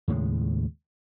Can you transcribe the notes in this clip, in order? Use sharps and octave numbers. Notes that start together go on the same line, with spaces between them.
D#2 A2 C#3 G#3